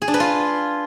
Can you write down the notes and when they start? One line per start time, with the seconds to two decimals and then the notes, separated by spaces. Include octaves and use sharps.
0.02 G#4
0.08 D4
0.14 B4
0.20 F4